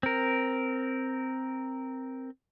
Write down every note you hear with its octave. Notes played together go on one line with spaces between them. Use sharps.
C4 A#4